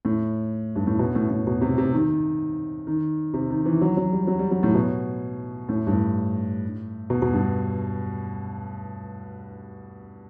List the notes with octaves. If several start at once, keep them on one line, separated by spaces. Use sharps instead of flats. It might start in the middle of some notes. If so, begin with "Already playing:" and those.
A2
G2
A2
B2
A2
A2
B2
C3
C3
D#3
D#3
C3
D#3
E3
F#3
F#3
G3
F#3
G3
F#3
A2
B2
A2
G2
A2
B2
B2
G2